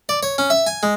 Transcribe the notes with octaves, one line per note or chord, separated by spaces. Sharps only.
D5
C#5
C#4
E5
G#5
G#3